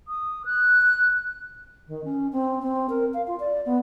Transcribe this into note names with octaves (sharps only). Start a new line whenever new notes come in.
D#6
F#6
D#3
C#4
C4
C4
A#4
F5
F4
D5
B3